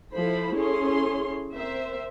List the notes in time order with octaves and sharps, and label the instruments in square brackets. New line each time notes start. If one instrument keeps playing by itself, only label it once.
[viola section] F3 E4 A4 C5 B5
C#4 E4 G#4 A4 C#5 C6
C4 A#4 C5 E5